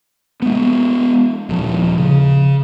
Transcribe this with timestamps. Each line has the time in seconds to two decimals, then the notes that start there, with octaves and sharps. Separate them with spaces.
0.42 G#3 B3
1.49 D#1 F3
1.98 C#3